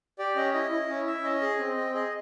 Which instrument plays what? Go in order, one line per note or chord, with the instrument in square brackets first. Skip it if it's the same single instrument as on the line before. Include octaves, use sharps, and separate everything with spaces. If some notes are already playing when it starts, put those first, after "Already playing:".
[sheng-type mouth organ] G4 D5
C#4 D#5
E4 D#5
E4
C#4
E4 E5
C#4 D#5
G#4
C4
C4
G#4 D#5